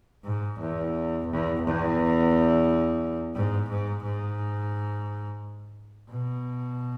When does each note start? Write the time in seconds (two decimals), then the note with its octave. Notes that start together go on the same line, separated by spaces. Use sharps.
0.24 G#2
0.59 E2
1.27 E2
1.62 E2
3.34 G#2
3.68 G#2
4.03 G#2
6.09 B2